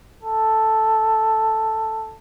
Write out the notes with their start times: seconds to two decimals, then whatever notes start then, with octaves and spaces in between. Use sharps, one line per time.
0.23 A4